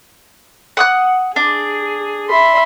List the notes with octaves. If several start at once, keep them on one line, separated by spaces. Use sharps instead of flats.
F#5 D#6 F#6
D4 G#4
E5 B5 C6